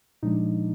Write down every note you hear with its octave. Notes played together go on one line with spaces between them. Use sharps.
A#2 F3 G#3 D4 D#4